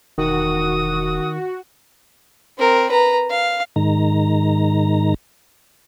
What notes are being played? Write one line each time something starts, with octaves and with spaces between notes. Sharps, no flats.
E1 D#3 F#4 D#6
C4 A#4
B4 A#5
F5
G#2 D#3 A#5